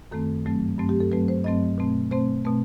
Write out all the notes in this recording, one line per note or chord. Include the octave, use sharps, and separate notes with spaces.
F#2 D#3 A3 C4 A4
G2 F#3 A3 C4
G2 F#3 A3 C4
G4
A4
G2 F#3 A3 C4 B4
C5
G2 F#3 A3 C4 D#5
B2 A3 C4
B2 A3 C4 C5
B2 A3 C4